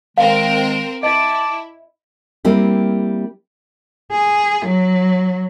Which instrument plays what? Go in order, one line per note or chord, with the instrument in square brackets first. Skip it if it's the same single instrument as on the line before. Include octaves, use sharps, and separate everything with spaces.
[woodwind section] D#3 G#3 [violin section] C4 A#4 [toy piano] F5
[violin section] E4 [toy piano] D#5 [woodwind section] A5 D6
[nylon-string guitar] G3 A#3 C4 E4
[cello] G#4
F#3